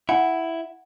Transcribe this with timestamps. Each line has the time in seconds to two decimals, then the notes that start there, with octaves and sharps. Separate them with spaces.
0.09 E4 F#5 G#5